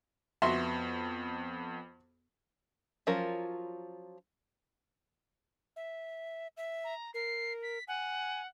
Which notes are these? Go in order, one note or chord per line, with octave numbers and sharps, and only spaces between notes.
F2 B3 F#4 E5 C6
F3 F#3 C#4 F4 A#4
E5
E5
A#5
A#4 C7
B6
F#5 G#5